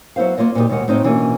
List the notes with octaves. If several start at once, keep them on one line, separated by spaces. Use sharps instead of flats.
F#3 B3 E4 C5 F5
A#3 F4 C#5 D#5
A#2 B3 D#4 G4
D#2 B2 G#3 F#5
A2 C4 D#4 C#5
B2 E3 A#3 C#4 D4 F4